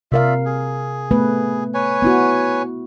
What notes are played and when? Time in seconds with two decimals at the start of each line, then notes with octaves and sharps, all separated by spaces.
0.12 C3 F4 A#4 D5 E5 F5
0.45 G#4
1.11 A3 B3 B4
1.74 B4 C#5 G#5
2.02 B3 E4 F#4